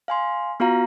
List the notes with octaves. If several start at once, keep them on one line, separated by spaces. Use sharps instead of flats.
F5 G#5 C6
B3 F4 F#4 F5 A#5